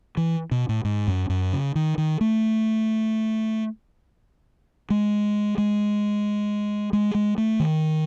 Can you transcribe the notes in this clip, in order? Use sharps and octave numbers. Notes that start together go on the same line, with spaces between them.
E3
B2
A2
G#2
F#2
F#2
C#3
D#3
D#3
A3
G#3
G#3
G#3
G#3
A3
D#3